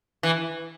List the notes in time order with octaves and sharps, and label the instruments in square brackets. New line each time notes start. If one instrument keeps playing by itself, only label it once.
[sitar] E3